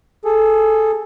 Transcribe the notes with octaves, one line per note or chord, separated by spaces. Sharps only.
G#4 A4